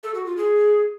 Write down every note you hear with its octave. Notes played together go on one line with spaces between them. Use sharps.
A4
F#4
F4
G#4